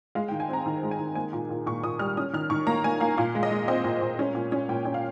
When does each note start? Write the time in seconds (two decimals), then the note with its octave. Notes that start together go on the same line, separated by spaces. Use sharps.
0.15 G#3 F5
0.28 G5
0.32 D#3
0.40 G#5
0.49 C4 A#5
0.66 D#3
0.83 G#3
0.91 G#5
0.99 D#3
1.15 A#3 G#5
1.33 A#2
1.50 A#2
1.66 A#2 C#6
1.83 A#2 D#6
1.99 G3 F6
2.17 C#4 D#6
2.33 D#3 F6
2.50 D#3 C#6
2.67 A#3 A#5
2.84 A#3 G#5
3.00 A#3 F5
3.18 A#2 F5
3.35 G#3
3.43 D#5
3.51 G#3
3.68 C4 D#5
3.84 A#2
4.01 A#2
4.19 C#4
4.35 A#2
4.52 C#4
4.69 A#2 G5
4.85 C#4
4.94 F5